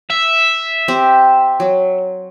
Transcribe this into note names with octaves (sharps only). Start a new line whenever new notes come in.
E5
C4 G4
F#3